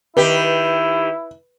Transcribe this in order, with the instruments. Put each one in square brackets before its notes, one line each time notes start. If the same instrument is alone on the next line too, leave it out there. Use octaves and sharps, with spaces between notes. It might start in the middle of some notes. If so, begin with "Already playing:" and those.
[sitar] D#3 G4 [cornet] E4 [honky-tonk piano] B4